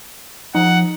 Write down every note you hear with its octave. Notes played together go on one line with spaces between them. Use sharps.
F3 D#4 F#5